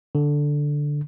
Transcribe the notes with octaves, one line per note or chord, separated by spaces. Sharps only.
D3